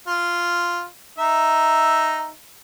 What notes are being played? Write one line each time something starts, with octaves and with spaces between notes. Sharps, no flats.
F4
D#4 E5